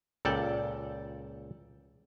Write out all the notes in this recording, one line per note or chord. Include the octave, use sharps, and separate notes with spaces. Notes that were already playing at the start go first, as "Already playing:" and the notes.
C#2 A#2 A4 D5 G5